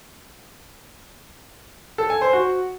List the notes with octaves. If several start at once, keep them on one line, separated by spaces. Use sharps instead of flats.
A4
G#5
C5
F#4